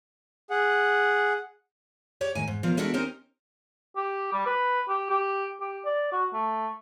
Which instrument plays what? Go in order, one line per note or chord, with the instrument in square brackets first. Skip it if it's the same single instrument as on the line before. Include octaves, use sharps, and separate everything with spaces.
[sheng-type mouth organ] G#4 F#5
[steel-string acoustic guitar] G4 C#5 D5
A2 D#3 G#5
G#2
B2 F3 F4 A#4 D5
G#3 D4 E4 F#4 A4 A#4
C4 C#4 D#4 G4 A#4 C5
[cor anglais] G4
G3
B4
G4
G4
G4
D5
F#4
A3